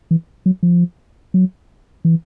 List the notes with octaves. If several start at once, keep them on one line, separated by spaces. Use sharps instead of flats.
E3
F#3
F3
F#3
E3